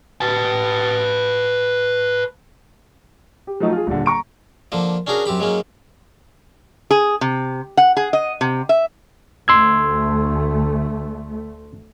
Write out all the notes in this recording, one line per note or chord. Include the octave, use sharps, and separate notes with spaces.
B4 A5
G4
F3 F#3 A3 D#4 F#4
F4 G#4
D#1 D3
A#5 C#6 D7
D3 F3 A#3
C#4 D4 F#4 G#4 A#4
F#2 C4 G4 B5
F#3 G#3 A#3 C#4
G#4
C3
F#5
G#4
D#5
C3
E5
D2 A3 C6 E6 G#6